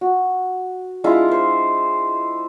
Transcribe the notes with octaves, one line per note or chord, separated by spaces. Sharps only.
F#4
G#3 D4 E4 F4
E4 C5